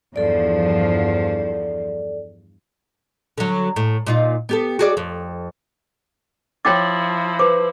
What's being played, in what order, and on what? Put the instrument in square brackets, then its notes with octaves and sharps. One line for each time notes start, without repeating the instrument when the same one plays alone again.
[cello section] E2 G2 F3 [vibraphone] A4 D5
[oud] D3 F#3
A2
A#2 D#4 F4
B3 G4 A4
F#4 G#4 D5
F2
[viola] F3 E4 [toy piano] C#5 G5 D6 [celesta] A6
[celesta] B4 C5 [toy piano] D6